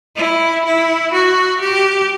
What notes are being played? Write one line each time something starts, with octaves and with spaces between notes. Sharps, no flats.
E4
E4
F#4
G4